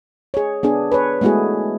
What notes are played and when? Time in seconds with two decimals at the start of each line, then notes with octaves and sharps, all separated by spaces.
0.34 G#4 C#5
0.63 B3 D4 G#4
0.92 B4 C#5
1.21 G#3 A3 B3 E4 F#4 G#4